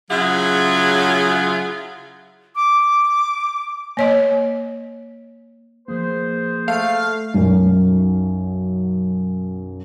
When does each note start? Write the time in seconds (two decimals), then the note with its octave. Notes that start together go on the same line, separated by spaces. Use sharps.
0.10 C#3 F#3 E4 F4 G#4 F#5
2.56 D6
3.97 A#3 C#5 D#5
5.88 F3 A#3 G#4 B4 C5
6.68 A3 F5
7.34 B1 F#2